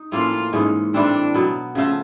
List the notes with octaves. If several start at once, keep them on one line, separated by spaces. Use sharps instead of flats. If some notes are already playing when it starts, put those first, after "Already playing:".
Already playing: D#4
A2 F3 A#3 C#4 F4
G#2 E3 G#3 C#4
A2 E3 G3 C4 D4
B2 F#3 B3
C#3 F3 A3